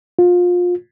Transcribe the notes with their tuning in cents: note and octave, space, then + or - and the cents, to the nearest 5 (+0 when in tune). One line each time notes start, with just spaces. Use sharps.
F4 +25